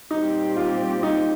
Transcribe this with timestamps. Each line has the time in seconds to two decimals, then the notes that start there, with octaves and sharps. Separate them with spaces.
0.10 A#2 G3 C4 D#4 G4
0.56 F4
1.03 D#4